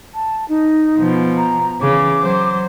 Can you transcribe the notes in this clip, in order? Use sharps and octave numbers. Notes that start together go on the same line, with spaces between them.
A5
D#4
B2 F3
A#5
C#3 E3 D6
F#3 C5